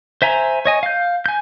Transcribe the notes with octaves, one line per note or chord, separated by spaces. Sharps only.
C5 E5 G#5 A#5
C#5 D#5 G#5
F5 G6
G#5 G6